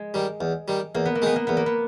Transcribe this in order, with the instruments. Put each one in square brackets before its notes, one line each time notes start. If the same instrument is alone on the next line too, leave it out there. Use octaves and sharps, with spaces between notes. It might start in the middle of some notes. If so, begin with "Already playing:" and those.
Already playing: [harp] G#3
[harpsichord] D#3 G3
E2
D#3 G3
[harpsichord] E2 [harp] A#3
[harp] B3
A#3
[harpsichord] D#3 G#3 D#4 [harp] B3
[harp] A#3
[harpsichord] E2 [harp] B3
[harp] A#3
B3